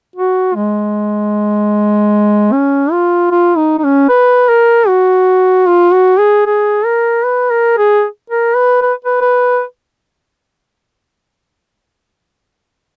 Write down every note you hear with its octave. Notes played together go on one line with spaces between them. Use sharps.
F#4
G#3
C#4
F4
F4
D#4
D#4
C#4
B4
A#4
F#4
F4
F#4
G#4
G#4
A#4
B4
A#4
G#4
A#4
B4
B4
B4
B4